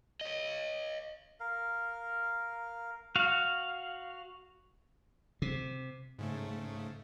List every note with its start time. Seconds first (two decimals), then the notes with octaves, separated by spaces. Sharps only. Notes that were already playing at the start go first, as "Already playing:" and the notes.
0.21 C#5 D#5
1.40 A#4 F5
3.16 F#4 F5
5.42 C3
6.19 G#2 C#3 A3